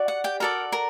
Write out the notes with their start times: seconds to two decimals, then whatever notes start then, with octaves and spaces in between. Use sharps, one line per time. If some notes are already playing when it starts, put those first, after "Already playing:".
Already playing: F#4 D5
0.08 F#5
0.24 G4 G5
0.40 F#4 A4 A#4 D5 A#5
0.72 A#4 A#5